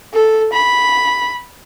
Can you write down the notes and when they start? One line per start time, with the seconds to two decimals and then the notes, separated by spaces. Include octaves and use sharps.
0.14 A4
0.53 B5